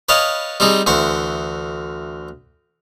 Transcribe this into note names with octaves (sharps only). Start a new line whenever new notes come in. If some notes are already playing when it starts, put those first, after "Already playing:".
B4 C#5 D#5 F5 A5
G3 C4 D#4 G#4
D2 E3 C5 C#6